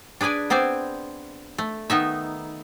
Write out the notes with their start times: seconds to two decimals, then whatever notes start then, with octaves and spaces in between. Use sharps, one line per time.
0.21 D4 G#4 B4 D5 G#5
0.50 B3 C4 C5 D5 G#5
1.58 A3
1.90 D#3 B3 D#4 E5